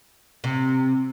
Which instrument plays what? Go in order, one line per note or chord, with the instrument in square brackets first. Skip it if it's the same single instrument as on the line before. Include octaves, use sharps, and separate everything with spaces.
[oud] C3